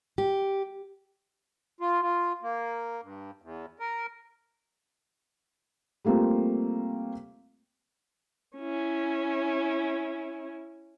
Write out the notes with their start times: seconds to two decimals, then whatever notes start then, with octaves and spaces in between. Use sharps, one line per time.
0.18 G4
1.81 F4
2.02 F4
2.42 A#3
3.02 G2
3.42 E2
3.79 A#4
6.05 G3 A3 A#3 C4 F4
8.57 C#4 E4